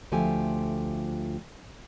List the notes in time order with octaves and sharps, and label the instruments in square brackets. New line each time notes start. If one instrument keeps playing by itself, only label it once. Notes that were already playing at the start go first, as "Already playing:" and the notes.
[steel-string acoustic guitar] D2 F3 A3 F4 G4 G#5